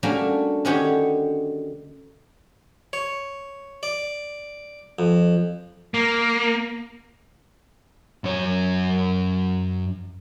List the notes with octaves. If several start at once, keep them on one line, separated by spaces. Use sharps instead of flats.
G3 A3 A#3 C#4 D4 F#4
D3 D#3 C#4 F#4 G4 C#5
C#5
D5
F2
A#3
F#2 C#5